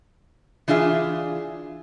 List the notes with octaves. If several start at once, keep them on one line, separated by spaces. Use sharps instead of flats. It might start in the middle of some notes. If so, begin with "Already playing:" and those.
E3 D4 F4 G#4 E5